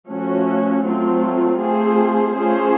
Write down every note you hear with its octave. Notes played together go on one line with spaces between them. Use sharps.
F3 A3 C#4 F#4
F#3 A3 C4 F4
A3 C4 F4 G#4 C5
A3 C#4 F4 G#4 C5